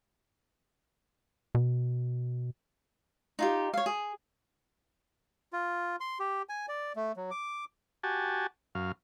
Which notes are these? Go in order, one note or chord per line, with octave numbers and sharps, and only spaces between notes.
B2
D#4 F4 G4
C#5 F5
G#4
F4
C6
G4
G#5
D5
A3
F#3
D6
F#4 G4 G#5 A5
F#2 F5